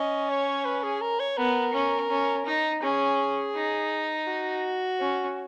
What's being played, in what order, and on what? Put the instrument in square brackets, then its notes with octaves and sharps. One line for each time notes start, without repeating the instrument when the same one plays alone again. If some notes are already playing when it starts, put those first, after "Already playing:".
Already playing: [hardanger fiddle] C#4 [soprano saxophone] D#5
[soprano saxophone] C#5
B4
G#4
A#4
C#5
[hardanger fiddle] B3 [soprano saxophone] A#4
[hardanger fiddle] C#4
C#4
D#4
[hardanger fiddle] C#4 [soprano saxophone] G#4
[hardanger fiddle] D#4
[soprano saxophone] F#4
[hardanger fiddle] C#4